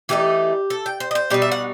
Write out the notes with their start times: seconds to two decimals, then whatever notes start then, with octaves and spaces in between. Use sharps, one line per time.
0.09 E3 A3 D#4 G4
0.70 A4
0.86 G5
1.00 C5
1.11 D#5
1.15 C5
1.30 B2 G3 D#4 G5
1.42 E5
1.51 F#5